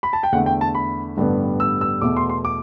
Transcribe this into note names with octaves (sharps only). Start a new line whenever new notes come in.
B5
A5
G5
E2 D3 A3 F#5
G5
A5
B5
A1 G2 D3 G3 B3
E6
E6
E2 B2 A3 D6
C6
C6
D6